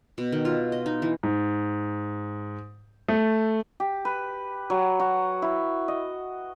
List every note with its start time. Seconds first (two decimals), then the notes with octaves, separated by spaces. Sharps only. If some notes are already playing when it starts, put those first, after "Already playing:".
0.18 B2
0.32 D#3
0.45 F4
0.72 D#5
0.86 D#4
1.02 E3
1.23 G#2
3.08 A3
3.80 G4
4.05 B4
4.70 F#3
5.00 F#4
5.42 E4
5.88 D#5